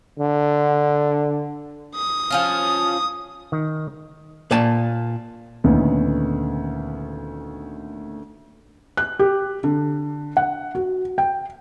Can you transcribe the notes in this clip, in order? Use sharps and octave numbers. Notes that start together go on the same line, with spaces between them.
D3
D#6
F3 C#4 F4
D#3
A#2 D5 G#5 A5
D2 A#2 D#3 A3 B3 C#4
F#6
G4
D3
F#5
F#4
G5